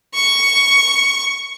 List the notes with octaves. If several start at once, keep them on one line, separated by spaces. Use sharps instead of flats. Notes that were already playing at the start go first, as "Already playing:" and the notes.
C#6